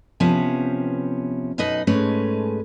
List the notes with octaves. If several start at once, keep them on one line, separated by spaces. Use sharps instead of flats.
C3 F3 B3 C#4
F#2 B2 D#4 B4 D#5
G#2 G#3 A3 C#4 B4